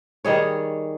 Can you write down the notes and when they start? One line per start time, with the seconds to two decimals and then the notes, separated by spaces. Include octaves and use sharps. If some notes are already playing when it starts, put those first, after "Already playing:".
0.25 D#3 G3 G#4 C#5